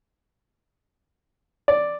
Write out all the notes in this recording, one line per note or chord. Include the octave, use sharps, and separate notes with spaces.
D5